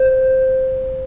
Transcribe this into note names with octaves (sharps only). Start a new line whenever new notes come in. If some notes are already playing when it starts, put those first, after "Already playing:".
Already playing: C5